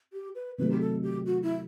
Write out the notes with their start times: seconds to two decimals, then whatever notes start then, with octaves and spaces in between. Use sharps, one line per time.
0.13 G4
0.35 B4
0.58 C3 D#3 F#3 A3 B4
0.71 G4
0.80 A4
1.03 G4
1.26 F#4
1.43 E4